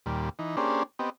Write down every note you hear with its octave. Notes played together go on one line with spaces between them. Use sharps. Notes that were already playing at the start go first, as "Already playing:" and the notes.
D#2 A#2 G3
E3 D#4
A#3 C#4 D4 G4 G#4 C5
B3 C4 G4 D#5